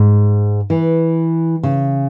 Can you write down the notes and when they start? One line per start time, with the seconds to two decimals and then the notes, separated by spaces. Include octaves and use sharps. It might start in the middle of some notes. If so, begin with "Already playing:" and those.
Already playing: G#2
0.70 E3
1.63 C#3